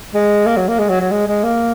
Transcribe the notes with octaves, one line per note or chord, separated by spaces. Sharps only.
G#3
A#3
F#3
A#3
G#3
F#3
F#3
G#3
G#3
A#3